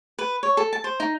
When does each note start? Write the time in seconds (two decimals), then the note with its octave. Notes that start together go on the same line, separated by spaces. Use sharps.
0.19 B4
0.43 C#5
0.57 A4
0.73 A5
0.84 C5
1.00 D#4